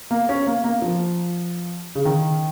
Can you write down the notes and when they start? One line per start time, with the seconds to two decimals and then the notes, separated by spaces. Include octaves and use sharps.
0.11 A#3
0.29 C#4
0.47 A#3
0.64 A#3
0.82 F3
1.95 C#3
2.05 D#3